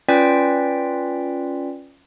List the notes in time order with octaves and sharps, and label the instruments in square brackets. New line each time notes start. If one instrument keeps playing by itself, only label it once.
[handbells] C#4 F4 B4 D5 G5 B6